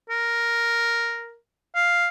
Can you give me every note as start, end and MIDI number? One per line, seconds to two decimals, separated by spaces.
0.10 1.36 70
1.75 2.08 77